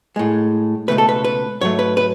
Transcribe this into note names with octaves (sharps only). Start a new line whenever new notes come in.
A2 G#3
C#2 B2 F#3 A3 B4
A4
B4
B4
G#2 F#3 A3 C#5
B4
B4